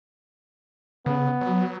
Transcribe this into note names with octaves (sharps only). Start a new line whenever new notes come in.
C#3 B3
F#3